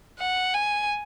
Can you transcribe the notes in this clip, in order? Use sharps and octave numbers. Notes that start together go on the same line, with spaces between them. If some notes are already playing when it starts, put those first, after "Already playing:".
F#5
G#5